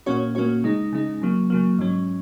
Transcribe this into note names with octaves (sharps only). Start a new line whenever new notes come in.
A#2 A#3 C#4 F#4 C#5
A#2 A#3 C#4 F#4 C#5
C#3 G#3 D#4
C#3 G#3 D#4
C#3 F#3 A#3
C#3 F#3 A#3
G#2 F#3 C#4